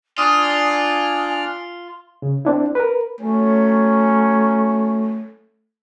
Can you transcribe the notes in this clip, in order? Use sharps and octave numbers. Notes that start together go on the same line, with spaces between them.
D4 F4 D5 G#5 D#6 F6
C#3
C4 D4 E4
A#4 B4
F#3 A3 C#4